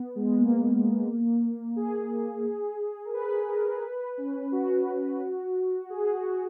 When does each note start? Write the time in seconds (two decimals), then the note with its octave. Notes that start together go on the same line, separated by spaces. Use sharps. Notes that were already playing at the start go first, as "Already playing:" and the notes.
Already playing: B3
0.16 G#3
0.38 A#3
1.76 G#4
3.05 A#4
3.14 B4
3.48 A#4
3.83 B4
4.18 C#4
4.52 F#4
5.90 G#4
6.13 F#4